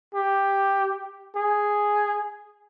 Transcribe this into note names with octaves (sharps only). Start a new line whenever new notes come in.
G4
G#4